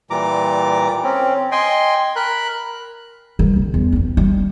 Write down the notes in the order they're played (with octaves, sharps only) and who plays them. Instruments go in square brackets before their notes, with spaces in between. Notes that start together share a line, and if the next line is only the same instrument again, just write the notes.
[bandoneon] A#2 E3 G3 A#5 D6
C4 C#4
D#5 G5 G#5 C6
A#4 B5 F#6
[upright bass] E3 G3
C#3
E2
A#3 C4
G3